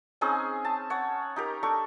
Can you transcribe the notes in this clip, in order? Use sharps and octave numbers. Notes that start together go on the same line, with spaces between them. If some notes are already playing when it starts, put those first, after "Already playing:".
C4 C#4 D#4 G#4
A5
C#5 F#5
D#4 G4 A#4
D4 A4 C#6